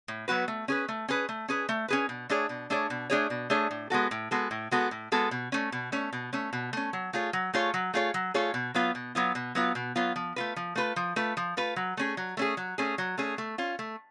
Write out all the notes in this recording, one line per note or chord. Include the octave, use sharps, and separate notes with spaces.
A2
F#3 B3 F#4 B4
A3
C#4 G#4 B4
A3
C#4 G#4 B4
A3
C#4 G#4 B4
A3
C#4 G#4 B4
B2
A3 D4 G#4 C#5
B2
A3 D4 G#4 C#5
B2
A3 D4 G#4 C#5
B2
A3 D4 G#4 C#5
A2
G#3 B3 F#4 A4
A2
G#3 B3 F#4 A4
A2
G#3 B3 F#4 A4
A2
G#3 B3 F#4 A4
B2
A3 C#4
B2
A3 C#4
B2
A3 C#4
B2
A3 C#4
F#3
A3 F4 G#4 C#5
F#3
A3 F4 G#4 C#5
F#3
A3 F4 G#4 C#5
F#3
A3 F4 G#4 C#5
B2
F#3 B3 F4
B2
F#3 B3 F4
B2
F#3 B3 F4
B2
F#3 B3 F4
F3
A3 F4 B4
F3
A3 F4 B4
F3
A3 F4 B4
F3
A3 F4 B4
F#3
A3 C#4 G#4
F#3
A3 C#4 G#4
F#3
A3 C#4 G#4
F#3
A3 C#4 G#4
A3
C#4 F4
A3